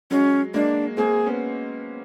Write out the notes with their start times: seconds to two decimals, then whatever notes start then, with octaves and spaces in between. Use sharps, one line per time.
0.11 F#3 G#3 C#4
0.54 G#3 A#3 D4
0.97 A#3 C4 G#4
1.26 B3 C#4